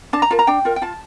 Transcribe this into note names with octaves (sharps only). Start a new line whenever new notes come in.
D4 A5
A#5
F4 A#4 A5
A#5
D4 G5
F4 A#4
G5
F4 A5